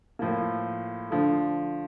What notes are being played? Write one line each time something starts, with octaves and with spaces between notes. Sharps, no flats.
A2 F3 A#3
D3 F3 A3